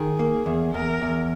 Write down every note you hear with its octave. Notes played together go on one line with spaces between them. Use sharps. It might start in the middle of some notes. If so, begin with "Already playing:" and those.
Already playing: D#3 G#4
A#3
E2
E2 A#4
E2